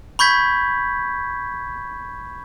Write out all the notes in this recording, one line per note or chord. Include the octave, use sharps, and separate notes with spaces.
B5 C#6 G6 G#6 B6